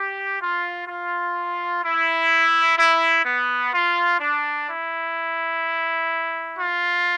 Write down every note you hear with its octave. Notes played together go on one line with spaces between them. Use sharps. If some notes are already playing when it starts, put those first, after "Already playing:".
Already playing: G4
F4
F4
E4
E4
B3
F4
D4
E4
F4